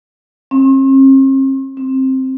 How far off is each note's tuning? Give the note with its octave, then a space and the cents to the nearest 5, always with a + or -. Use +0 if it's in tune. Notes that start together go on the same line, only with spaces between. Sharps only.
C4 +45
C4 +15